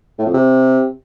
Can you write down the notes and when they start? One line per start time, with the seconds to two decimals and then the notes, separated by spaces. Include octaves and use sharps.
0.19 A2
0.26 F2
0.34 C3